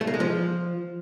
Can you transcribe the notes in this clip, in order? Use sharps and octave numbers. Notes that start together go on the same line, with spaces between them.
A3
A#3
G#3
F3